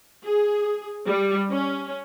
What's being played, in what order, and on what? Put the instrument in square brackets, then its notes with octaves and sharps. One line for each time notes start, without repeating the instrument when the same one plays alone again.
[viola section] G#4
G3
C#4